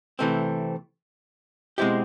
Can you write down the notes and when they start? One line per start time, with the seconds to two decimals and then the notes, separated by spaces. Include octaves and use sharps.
0.19 C3 E3 A3 C4
1.78 B2 G#3 C4 E4 G4